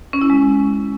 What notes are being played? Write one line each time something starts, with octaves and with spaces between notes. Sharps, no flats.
C#4
E4
G#3